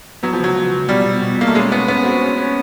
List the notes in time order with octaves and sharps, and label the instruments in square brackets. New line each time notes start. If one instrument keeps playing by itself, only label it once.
[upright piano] F#3 [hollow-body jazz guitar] B3
[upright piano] F3
[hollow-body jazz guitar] C#2 [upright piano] F#3
[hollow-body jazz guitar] C#2
C#2
[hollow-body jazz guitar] B2 [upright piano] G3
[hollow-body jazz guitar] B2
B2
[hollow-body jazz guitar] B2 [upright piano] A#3
[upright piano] A3
[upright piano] G#3 [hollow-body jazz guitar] C#4
[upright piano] B3 [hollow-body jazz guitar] C#4
[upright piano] B3 [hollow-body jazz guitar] C#4
[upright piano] C4 [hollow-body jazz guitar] F#4
[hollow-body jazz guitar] C#4
C#4